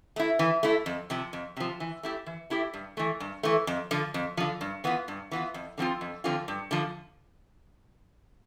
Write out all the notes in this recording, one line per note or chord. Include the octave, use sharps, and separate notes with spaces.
A3 E4
E3
A3 E4
F2
C3 F3
F2
C3 F3
E3
A3 E4 G4
E3
A3 E4 G4
G2
E3 A3
G2
E3 A3
F2
D3 F3
F2
D3 F3
G2
E3 B3 F4
G2
E3 B3 F4
F2
D3 F3 C4 F4
F2
D3 F3 C4 F4
G2
D3 F3